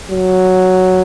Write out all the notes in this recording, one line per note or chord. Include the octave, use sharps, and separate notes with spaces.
F#3